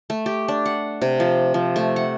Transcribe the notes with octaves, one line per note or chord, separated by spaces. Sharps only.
A3
G4
D4
F#5
C3
F3
F3
A3
F#5